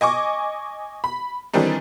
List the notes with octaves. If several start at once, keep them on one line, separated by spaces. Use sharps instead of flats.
D#5 G#5 C#6 D6
B5
D#3 E3 G3 C4 D4 D#4